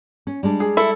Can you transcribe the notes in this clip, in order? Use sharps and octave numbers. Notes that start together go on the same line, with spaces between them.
C#4
G3 G#3 D4
G#4
E4 A4